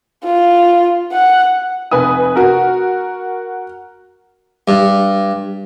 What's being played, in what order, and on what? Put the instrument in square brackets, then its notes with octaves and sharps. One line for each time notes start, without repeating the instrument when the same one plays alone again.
[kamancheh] F4
F#5
[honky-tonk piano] F1 B4 G#5 D#6
F#4 A#4
[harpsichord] G2